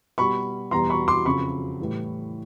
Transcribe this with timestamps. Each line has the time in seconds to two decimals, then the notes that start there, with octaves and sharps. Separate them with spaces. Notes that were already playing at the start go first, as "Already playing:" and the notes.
0.18 B2 G3 B5 C#6
0.71 E2 B2 G3 A#5 C6
0.90 B5 C#6
1.08 C6 D6
1.25 F2 C#3 F#3 B5 C#6
1.80 A2 E3 G3